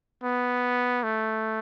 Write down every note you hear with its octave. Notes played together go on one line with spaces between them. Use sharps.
B3
A3